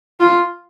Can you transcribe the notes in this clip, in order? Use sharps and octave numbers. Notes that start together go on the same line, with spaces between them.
F4